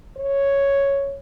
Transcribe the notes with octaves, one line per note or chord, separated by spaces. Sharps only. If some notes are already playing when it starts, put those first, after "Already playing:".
C#5